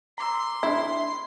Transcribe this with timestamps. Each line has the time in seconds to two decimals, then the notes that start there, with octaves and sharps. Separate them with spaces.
0.18 A#5 C6 D6 E6
0.63 D4 E4 G#6